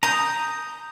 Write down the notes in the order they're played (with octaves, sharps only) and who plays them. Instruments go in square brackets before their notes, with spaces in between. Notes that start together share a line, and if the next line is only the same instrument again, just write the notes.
[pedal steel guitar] A#5 [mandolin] D#6 G6